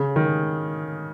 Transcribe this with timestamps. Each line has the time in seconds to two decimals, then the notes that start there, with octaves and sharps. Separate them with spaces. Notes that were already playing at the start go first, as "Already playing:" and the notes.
Already playing: C#3
0.16 D#3